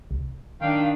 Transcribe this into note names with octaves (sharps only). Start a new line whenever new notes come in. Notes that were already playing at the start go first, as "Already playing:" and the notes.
C2
D#3 D4 F5 G5